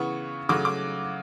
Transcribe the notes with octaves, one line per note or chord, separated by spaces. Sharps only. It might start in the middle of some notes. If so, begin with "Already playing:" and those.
Already playing: C#3 E3 B3 C#6
C#3 F#3 A3 D6
D6